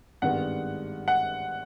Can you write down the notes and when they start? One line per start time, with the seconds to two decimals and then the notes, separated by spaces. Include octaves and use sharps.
0.22 G#1 G2 D#3 G#3 B3 F#5
1.08 F#5